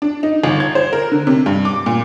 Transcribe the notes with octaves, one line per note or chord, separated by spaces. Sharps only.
D4
D#4
G1
G#6
C5
A#4
D3
C3
G2
D6
A#2